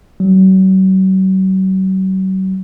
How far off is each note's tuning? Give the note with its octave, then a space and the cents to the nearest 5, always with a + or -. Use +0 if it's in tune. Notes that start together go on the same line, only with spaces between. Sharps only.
F#3 +40